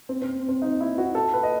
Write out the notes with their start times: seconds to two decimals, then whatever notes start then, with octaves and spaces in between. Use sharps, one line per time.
0.09 C4
0.22 C4
0.49 C4
0.62 D#4
0.81 E4
0.98 F#4
1.15 A4
1.33 B4
1.43 D#5